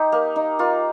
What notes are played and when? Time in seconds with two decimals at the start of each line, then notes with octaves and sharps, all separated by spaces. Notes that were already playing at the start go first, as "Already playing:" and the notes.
Already playing: D#4 G4
0.12 A#3
0.36 D#4
0.59 A#3 F4